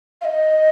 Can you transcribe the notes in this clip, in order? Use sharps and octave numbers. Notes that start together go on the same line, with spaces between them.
F5
D#5